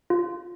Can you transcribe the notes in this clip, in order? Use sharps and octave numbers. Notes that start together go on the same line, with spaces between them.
F4